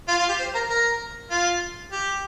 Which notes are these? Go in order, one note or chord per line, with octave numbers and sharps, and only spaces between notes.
F4
F4
G4
C5
A#4
A#4
F4
G4